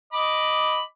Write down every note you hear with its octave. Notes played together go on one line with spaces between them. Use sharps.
D#5 B5 D6